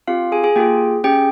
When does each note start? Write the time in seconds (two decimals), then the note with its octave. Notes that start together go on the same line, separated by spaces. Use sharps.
0.07 C4 F4 G4 F5
0.32 G#4 G#5
0.44 G#4 G#5
0.56 A#3 F4 G4 G#4 G5
1.04 C#4 G4 G#4 G5